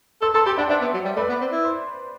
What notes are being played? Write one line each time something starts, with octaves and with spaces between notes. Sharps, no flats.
A4 C6 E6
A4 A5 C6
G4 G5 B5
D4 D5 F#5
D4 C5 E5
B3
F#3
G3
A3 B4 D5
B3
C4
E4
C5